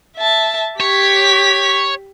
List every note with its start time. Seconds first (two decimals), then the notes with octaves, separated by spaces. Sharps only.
0.17 E5 A5
0.80 G4 C#5 B6